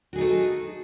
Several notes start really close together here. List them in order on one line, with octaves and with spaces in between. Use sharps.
F#4 G#4 D#4 A3